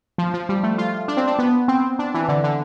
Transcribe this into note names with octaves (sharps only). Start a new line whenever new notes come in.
F3
F3
G3
A3
F4
D4
C4
D4
B3
C4
D4
E3
D3
D3